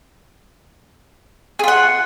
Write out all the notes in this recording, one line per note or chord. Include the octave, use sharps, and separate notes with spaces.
F4 G#4 F#5